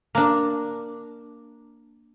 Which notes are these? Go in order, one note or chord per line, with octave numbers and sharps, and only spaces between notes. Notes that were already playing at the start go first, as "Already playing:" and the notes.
A#3 D4